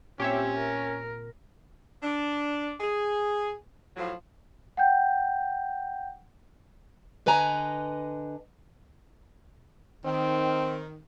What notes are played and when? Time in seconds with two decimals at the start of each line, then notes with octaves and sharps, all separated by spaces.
0.20 A#2 C4 C#4 G4 C#5 E5
0.58 A#4
2.03 D4
2.80 G#4
3.96 A2 F3 F#3
4.77 F#5 G5 G6
7.26 D3 B4 D#5 G#5 A#5
10.05 D#3 C4